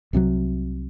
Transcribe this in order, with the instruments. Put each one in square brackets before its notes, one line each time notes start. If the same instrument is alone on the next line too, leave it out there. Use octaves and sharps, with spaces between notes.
[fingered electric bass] C2 C3 E3 F#3